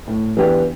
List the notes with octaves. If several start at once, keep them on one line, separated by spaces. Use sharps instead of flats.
A2
E3 B3 D4 G4